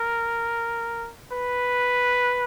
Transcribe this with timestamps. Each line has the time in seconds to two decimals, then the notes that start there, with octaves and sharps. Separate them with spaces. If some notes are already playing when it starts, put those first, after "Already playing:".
Already playing: A#4
1.33 B4